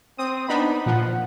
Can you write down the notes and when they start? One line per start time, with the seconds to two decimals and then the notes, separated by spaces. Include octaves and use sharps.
0.18 C4 D#6
0.49 B3 D4 D#4 B5
0.86 A#2 F3 F#5